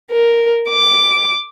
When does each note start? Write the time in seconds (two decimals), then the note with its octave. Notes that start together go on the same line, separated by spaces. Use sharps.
0.12 A#4
0.69 D6